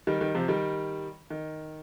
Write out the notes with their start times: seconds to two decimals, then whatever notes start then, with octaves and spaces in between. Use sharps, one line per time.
0.07 D#3 G3
0.20 D#3 G3
0.34 C3 F3
0.48 D#3 G3
1.30 D#3